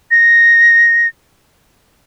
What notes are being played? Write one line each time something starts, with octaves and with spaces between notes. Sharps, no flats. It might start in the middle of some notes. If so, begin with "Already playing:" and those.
A#6